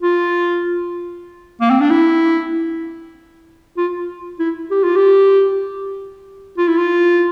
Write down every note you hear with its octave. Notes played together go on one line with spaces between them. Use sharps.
F4
A#3
C4
D4
E4
F4
E4
G4
F4
G4
F4
E4
F4